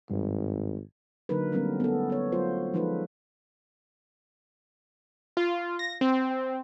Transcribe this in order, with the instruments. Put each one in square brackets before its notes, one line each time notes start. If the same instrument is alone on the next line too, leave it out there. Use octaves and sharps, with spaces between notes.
[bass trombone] G#1 [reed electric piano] G2
[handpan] D3 F#3 A#3 D#4 A#4 B4
F#3 G3 A3 B3 C#4 A#4
B3 A4
B3 C#5
F#3 A3 F4 C5
F3 G#3 D#4 F4 A4 B4
[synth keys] F4
A#6
C4